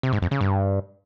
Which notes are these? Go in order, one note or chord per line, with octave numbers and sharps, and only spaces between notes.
C3
G#2
F2
C#3
G2